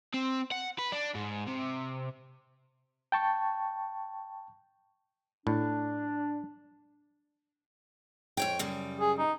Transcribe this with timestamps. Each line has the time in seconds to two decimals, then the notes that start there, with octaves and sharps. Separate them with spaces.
0.14 C4
0.52 F#5
0.78 B4
0.92 D4
1.15 G#2
1.47 C3
3.12 G5 A5 C#6
5.47 A2 D4
8.37 F2 C#5 G5
8.59 F#2 C#3 G3
9.00 G#4
9.18 D#4